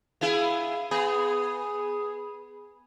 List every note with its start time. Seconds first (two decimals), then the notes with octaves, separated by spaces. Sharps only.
0.21 B3 E4 G#4 F5
0.91 B3 G#4 B5